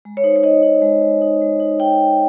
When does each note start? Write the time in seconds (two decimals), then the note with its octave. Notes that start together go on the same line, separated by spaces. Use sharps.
0.05 G#3
0.17 C#5
0.24 D#4 C5
0.36 C#5
0.43 D#4 D#5
0.63 D#4
0.82 G#3
1.02 G#3
1.22 D#4
1.41 G#3
1.60 D#4
1.80 D#4 G5